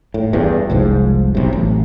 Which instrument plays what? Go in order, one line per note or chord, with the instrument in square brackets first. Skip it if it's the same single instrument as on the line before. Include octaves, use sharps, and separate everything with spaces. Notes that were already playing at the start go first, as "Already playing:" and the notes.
[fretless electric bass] A2
E2 G2
F1 C2 G#2 F3
B1 C3
A1